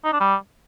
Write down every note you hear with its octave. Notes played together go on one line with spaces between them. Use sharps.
D#4
D4
G3